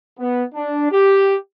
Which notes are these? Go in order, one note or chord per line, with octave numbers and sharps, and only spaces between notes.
B3
D4
G4